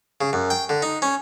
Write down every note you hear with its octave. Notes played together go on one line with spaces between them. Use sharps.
C#3
F#2
G5
D3
D#4
C#4